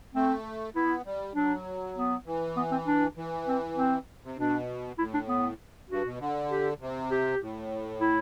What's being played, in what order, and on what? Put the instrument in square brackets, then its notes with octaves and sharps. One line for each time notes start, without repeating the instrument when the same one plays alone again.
[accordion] A3 [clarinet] C4
[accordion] B3 [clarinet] E4
[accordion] G3
[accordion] F#3 [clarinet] D4
[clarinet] B3
[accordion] E3
[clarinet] B3
C4
D4
[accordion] E3
[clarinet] C4
C4
[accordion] C3
[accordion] B2 [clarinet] D4
[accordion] A2 [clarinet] E4
[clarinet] D4
B3
[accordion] G2 [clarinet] F#4
[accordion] B2
D3
[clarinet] G4
[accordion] C3
[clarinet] G4
[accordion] A2
[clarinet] E4